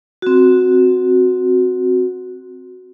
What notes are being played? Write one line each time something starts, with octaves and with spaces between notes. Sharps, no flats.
C4 F#4